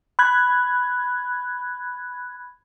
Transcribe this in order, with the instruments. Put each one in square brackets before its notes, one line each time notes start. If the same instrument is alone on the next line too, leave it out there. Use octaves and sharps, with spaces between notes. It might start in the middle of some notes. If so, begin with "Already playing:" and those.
[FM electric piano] B5 F#6 G#6